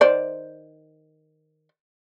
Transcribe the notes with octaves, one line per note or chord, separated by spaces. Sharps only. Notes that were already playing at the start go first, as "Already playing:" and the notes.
D#3 C5 D5